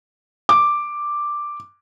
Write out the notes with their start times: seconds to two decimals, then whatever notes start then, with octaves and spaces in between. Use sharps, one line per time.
0.49 D6